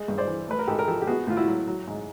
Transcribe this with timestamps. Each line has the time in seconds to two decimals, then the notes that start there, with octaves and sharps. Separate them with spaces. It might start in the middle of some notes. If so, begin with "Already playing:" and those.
Already playing: G#3
0.08 G2
0.18 C5 D5
0.28 E3
0.48 A3 B4
0.59 A#4
0.68 G#2 G4 A4
0.79 A#4
0.87 F3 G4 A4
1.02 G4
1.07 B3 F#4 G#4
1.27 A2 F4
1.37 E4 F#4
1.48 F#3
1.67 F#3
1.87 G#2